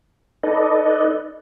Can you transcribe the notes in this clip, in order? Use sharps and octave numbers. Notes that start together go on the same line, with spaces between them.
D#4 A4 B4 D5 D#5